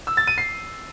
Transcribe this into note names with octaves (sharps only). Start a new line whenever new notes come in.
E6
A6
D#7
C7